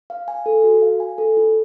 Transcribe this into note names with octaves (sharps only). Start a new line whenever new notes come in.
F5
G#5
A4
F#4
F5
G#5
A4
F4